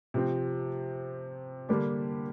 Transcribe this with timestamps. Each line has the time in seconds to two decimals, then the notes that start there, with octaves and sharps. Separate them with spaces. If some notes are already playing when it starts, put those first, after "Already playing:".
0.14 C3 F3 C4
1.69 D3 G3 A#3 D4 G4